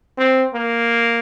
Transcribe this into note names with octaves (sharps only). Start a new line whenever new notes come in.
C4
A#3